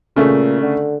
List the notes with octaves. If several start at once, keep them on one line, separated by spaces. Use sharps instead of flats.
A#2 C#3 A3
D3